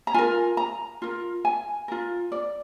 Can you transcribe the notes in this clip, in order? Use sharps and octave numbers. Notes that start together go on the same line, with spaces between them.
A#5
F4 A#4 G#5
A#5
F4 A#4
G#5
F4 A#4
D5